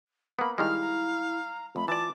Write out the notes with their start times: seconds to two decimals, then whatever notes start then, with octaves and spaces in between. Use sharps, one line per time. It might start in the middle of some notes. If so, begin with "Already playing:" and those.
0.39 A#3 B3 B5
0.58 D#3 G3 G#3 E4 F5 F6
0.82 A#5
1.76 F2 A3 B5
1.88 E3 F4 D5 A5 D6